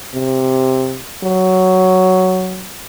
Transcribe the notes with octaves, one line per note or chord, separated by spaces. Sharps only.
C3
F#3